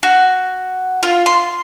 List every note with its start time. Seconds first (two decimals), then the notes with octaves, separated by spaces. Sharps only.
0.03 F#4
1.03 F4
1.26 C6